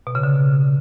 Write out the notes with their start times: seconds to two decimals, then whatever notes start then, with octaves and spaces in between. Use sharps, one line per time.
0.07 B2
0.15 C#3
0.23 D3